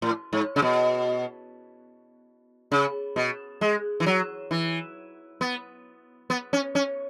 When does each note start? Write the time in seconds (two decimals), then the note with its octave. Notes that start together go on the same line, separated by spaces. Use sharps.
0.02 A2
0.33 G#2
0.56 C#3
0.62 B2
2.72 C#3
3.16 B2
3.61 G#3
4.00 E3
4.06 F#3
4.51 E3
5.41 B3
6.30 B3
6.53 C#4
6.75 C#4